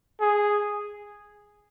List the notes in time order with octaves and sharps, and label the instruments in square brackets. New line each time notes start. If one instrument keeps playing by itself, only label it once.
[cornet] G#4